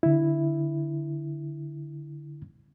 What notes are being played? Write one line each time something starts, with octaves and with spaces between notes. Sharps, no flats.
D3 E4